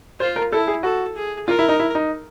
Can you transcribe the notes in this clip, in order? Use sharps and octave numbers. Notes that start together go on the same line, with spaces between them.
F4 C5
A#4
E4 A4
G#4
F#4 A4
G#4
F4 A#4
E4
D#4
E4
D#4